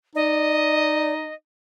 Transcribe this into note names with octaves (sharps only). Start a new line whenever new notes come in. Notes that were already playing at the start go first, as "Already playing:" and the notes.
D#4 D5 D#5